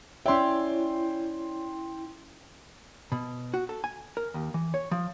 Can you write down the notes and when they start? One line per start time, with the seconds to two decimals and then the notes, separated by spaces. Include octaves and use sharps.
0.26 C#4 E4 C#5 D5 E5 G5 C6
3.12 B2
3.54 F#4
3.69 A4
3.84 G#5
4.17 A#4
4.34 D#2
4.54 E3
4.74 C#5
4.91 F3